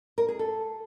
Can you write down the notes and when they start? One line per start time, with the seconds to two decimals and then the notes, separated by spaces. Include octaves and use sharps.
0.18 A#4
0.29 G#4
0.39 A4